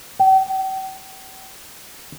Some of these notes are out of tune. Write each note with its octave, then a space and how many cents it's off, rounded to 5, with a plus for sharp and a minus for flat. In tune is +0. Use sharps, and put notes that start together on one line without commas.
G5 -40